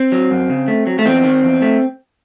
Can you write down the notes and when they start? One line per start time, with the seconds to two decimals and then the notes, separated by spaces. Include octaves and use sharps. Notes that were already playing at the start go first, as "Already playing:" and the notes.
Already playing: C4
0.12 F#3
0.31 F#2
0.50 C#3
0.68 A3
0.87 F#3
0.99 A3
1.05 E2 C4
1.24 D#3
1.44 E2
1.62 A3